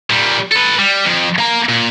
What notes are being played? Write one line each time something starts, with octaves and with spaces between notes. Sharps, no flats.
A#2 G3
A4 B4
G3
F2
A#3 A#5
A#2